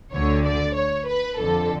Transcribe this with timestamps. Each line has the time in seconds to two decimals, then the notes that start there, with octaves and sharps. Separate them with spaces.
0.13 D2 D3 C#5
0.45 D5
0.76 C#5
1.08 B4
1.39 F2 D3 A4